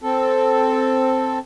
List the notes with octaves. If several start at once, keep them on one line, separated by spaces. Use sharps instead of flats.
C4 A4